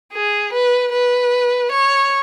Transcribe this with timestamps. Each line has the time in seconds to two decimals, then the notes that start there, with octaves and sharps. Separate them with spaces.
0.13 G#4
0.53 B4
0.92 B4
1.71 C#5